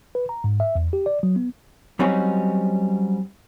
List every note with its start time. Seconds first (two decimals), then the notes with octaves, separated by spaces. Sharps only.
0.15 B4
0.29 A#5
0.44 G#2
0.60 E5
0.75 E2
0.93 G4
1.06 D5
1.23 F#3
1.36 B3
1.99 F#3 G3 C4 C#4 D#4 F#4